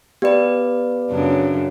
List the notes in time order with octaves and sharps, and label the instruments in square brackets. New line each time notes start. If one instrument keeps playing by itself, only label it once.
[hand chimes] B3 B4 [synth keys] G4 D5
[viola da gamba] F#2 C#3 D4